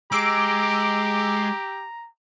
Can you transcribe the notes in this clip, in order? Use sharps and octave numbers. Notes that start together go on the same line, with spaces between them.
G#3 G4 A#5 D6 E6 D7